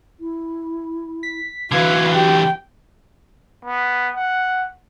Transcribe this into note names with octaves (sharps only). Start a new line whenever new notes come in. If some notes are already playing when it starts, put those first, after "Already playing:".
E4
B6
D3 E3 F#4 B4 F5 G#6
G4 G5
B3
F#5